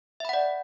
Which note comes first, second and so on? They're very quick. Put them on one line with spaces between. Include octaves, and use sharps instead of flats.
E5 B5 F#5 D5